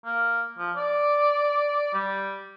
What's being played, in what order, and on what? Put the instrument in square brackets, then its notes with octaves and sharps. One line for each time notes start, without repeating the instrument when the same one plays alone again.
[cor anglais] A#3
F3
D5
G3